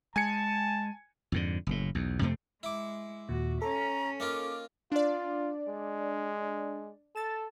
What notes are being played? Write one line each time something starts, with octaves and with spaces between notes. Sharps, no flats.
G#3 G#5 A5 G#6 C#7
F2 G#2 D3
F#1 A2
B1 E2
F2 C3 A3 C4
G#3 E4 D6
D#2 A#2 F#4
C#4 A4 A#5
A#3 D#4 F4 D6
D4 F4 D5
G#3
A4 A6 E7